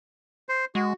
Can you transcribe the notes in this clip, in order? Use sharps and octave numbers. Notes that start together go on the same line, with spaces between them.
C5
G#3 F#4